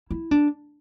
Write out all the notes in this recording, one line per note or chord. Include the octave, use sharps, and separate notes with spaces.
E4
D4